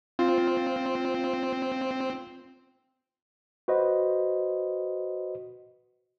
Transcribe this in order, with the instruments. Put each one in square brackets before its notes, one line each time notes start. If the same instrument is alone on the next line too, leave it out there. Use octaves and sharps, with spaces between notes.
[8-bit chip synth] C4 [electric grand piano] F4
[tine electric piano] F#4 B4 C5 D#5